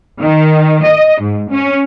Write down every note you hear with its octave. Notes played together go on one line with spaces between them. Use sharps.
D#3
D#5
G#2
C#4